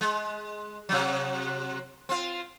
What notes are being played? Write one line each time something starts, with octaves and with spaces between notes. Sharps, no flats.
G#3
C3 F#3
C4 F4